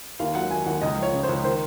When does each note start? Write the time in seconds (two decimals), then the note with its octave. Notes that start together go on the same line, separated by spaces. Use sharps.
0.20 D#2 F5
0.35 F#3 F#5
0.51 D#3 G#5
0.66 D#2 F#5
0.82 C#2 D#5
0.98 F3 C#5
1.13 C#3
1.23 C5
1.29 C#2
1.44 D#3 C5